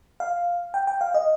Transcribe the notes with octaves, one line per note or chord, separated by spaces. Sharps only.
F5
G5
G5
F5
D#5